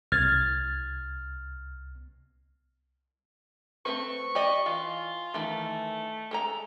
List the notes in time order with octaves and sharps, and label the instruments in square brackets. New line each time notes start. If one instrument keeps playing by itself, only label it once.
[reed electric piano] C2 G#6 A6 [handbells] F6
[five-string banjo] A3 C4 B4 [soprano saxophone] C#6
[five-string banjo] G4 D5 D#5
[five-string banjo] E3 [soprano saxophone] F4
[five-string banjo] D#3 E3 [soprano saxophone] A3
[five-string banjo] G#3 A4 A#5